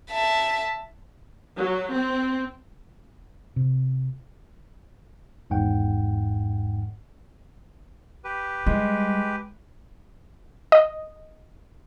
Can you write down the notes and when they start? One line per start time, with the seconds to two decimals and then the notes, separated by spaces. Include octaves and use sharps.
0.11 E5 A5
1.56 F#3
1.93 C4
3.56 C3
5.50 G#1 E2 G#2 F#5 G5
8.24 G4 B4
8.66 G3 G#3
10.72 D#5